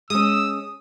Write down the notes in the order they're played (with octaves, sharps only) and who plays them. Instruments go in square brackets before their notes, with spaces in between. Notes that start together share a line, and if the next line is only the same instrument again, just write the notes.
[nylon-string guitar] G#3 C#4 [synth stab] D#6 [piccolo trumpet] E6